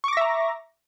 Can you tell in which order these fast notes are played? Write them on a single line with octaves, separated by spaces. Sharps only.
C#6 D6 A#6 E5 A#5